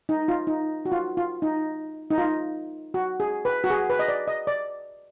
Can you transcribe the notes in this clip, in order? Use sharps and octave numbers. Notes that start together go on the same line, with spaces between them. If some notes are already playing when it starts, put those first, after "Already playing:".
D#4
F4
D#4
F#4
F4
F4
D#4
D#4
F4
F#4
G#4
B4
F#4
G#4
B4
D#5
D5
D#5
D5